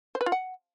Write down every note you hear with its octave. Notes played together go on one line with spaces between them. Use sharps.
C5
B4
F4
F#5